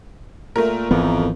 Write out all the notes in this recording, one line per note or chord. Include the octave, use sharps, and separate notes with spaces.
A#2 A3 A#4
G#1 F2 E3 B3